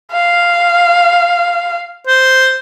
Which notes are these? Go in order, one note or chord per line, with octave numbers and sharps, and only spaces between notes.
F5
C5